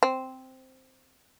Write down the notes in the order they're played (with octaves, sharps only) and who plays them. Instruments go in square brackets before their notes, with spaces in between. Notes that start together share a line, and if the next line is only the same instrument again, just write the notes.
[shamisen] C4